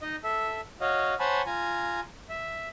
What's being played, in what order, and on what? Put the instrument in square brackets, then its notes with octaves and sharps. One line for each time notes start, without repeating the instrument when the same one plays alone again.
[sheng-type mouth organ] D#4 D#5
A4 E5
F#4 C#5 D#5 F5
C5 C#5 F#5 G#5 A5 B5
F4 G#5 A#5
E5